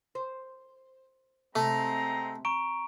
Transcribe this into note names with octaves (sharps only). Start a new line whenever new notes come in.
C5
C3 G#3 A3 C4 A#5
A#5 C#6 D7